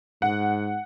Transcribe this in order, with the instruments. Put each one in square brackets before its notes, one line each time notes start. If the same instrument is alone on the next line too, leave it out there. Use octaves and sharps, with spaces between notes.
[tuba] G#2 [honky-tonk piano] F#5